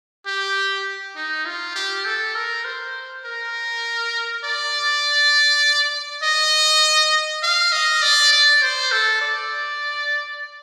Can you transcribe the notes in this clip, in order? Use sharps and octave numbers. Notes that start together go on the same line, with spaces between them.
G4
D#4
F4
G4
A4
A#4
C5
A#4
D5
D#5
F5
D#5
D5
D5
C5
A4
D5